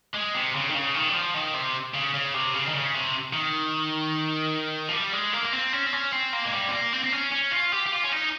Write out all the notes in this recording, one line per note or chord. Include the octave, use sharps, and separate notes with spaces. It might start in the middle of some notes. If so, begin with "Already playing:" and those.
G#3
C3
C#3
D#3
C#3
D#3
G3
F3
D#3
C3
C#3
C#3
C3
C#3
D#3
C#3
C3
D#3
F3
G3
G#3
A#3
A#3
C4
C#4
C4
C#4
C4
A#3
G#3
G3
C4
A#3
C4
C4
C#4
C#4
F4
G4
G4
F4
C#4
D#4